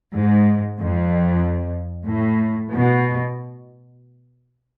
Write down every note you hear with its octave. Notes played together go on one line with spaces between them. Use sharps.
G#2
F2
A2
B2